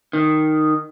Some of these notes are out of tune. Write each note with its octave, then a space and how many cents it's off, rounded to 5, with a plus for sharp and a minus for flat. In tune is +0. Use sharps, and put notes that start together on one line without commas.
D#3 -5